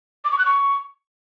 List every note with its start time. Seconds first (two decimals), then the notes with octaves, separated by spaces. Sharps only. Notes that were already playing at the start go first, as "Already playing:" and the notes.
0.25 D6
0.32 C#6
0.39 F#6
0.45 C#6